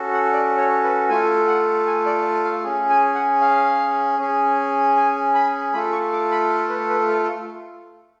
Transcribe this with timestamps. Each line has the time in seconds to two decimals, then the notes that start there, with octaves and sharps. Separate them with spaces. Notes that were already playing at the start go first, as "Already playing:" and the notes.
Already playing: C#4 F#4 A4
0.13 F#5
0.32 D5
0.58 C#5
0.84 B4
1.09 A3 F4 A4 G#5
1.47 F#5
1.87 G#5
2.06 D5
2.45 F5
2.64 C#4 G#4
2.90 G#5
3.15 F#5
3.41 F5
4.19 C#4 G#4
4.96 G#5
5.35 B5
5.73 A3 F4 A4 B5
5.92 C#6
6.12 D6
6.32 B5
6.69 B4
6.90 B4
7.08 A4
7.23 A4